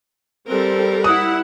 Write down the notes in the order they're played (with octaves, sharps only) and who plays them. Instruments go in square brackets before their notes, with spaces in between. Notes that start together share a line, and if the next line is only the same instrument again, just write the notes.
[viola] G3 A#4 [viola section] C4 A4
[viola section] E4 F#5 [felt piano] D#6